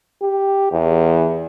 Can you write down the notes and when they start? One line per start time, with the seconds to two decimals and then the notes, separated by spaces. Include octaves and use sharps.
0.22 G4
0.72 E2